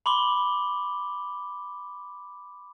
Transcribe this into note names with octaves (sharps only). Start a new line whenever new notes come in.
B5 C6 D6 G7